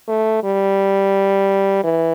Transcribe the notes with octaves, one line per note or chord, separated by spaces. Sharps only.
A3
G3
E3